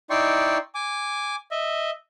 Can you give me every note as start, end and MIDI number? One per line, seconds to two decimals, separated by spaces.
0.10 0.58 63
0.10 0.58 64
0.10 0.58 74
0.10 0.58 79
0.10 0.58 84
0.10 0.58 85
0.75 1.36 80
0.75 1.36 86
1.51 1.91 75
1.51 1.91 76